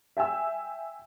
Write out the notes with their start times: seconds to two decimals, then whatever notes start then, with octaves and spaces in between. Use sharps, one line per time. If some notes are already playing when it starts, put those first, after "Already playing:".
0.17 E5 G5 G#5 E6